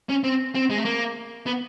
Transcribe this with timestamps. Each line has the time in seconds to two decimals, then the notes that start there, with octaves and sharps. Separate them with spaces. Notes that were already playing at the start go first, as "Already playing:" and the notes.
0.09 C#4
0.24 C4
0.55 C4
0.70 G#3
0.78 A3
0.85 A#3
1.46 B3